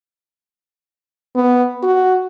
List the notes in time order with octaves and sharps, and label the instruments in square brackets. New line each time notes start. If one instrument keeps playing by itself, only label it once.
[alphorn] B3
F#4